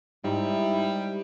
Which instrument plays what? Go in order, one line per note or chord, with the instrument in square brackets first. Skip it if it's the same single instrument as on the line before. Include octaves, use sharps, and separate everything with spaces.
[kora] G#2 [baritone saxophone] G3 [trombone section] D#4 E4